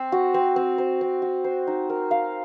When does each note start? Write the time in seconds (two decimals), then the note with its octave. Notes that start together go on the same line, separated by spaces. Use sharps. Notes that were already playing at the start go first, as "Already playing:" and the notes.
Already playing: C4 C5
0.12 F#4
0.34 C4
0.56 C4
0.78 C5
1.01 C4
1.22 F#4
1.44 C5
1.67 D#4
1.90 A#4
2.11 F5